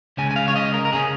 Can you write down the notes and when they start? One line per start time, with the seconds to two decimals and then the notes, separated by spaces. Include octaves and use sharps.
0.17 C#2 C#3 G#3 C#4 G#5
0.31 G#5
0.36 F5
0.48 C#5
0.56 D#5
0.74 A#4
0.85 A#4
0.93 C#3 A#3 C#4 G#4